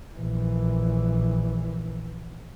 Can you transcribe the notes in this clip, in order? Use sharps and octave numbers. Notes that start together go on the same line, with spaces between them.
A#1 E3